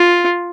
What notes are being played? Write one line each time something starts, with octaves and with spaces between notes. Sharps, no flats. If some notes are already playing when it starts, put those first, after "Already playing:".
Already playing: F4